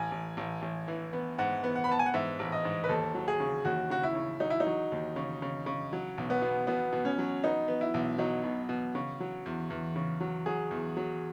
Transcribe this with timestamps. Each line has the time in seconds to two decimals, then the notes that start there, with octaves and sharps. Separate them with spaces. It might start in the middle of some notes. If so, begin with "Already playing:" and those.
Already playing: A1 G#5
0.11 A1
0.37 A1
0.62 A1
0.88 E3
1.13 B3
1.38 G#2 F#5
1.64 B3
1.75 F#5
1.84 B5
1.89 B3 A5
1.99 G#5
2.06 F#5
2.14 G#2 E5
2.39 A1
2.52 D#5
2.65 G#2
2.84 B4
2.89 D#2 A4
3.15 F#3
3.28 G#4
3.40 C#3
3.65 D#2 F#4
3.90 C#3 F#4
4.03 E4
4.15 C#3
4.40 F#3 D#4
4.50 E4
4.60 D#4
4.67 F#3
4.92 D#2
5.16 C#3
5.42 C#3
5.66 C#3
5.93 F#3
6.18 B1
6.30 B3
6.42 B2
6.67 B2 B3
6.92 B2
7.05 C#4
7.18 F#3
7.44 B3 D#4
7.68 B3
7.81 E4
7.94 B1
8.18 F#3 D#4
8.44 B2
8.69 B2
8.95 C#3
9.20 F#3
9.46 E2
9.70 E2
9.96 C#3
10.20 F#3
10.46 F#3 G#4
10.71 E2
10.97 F#3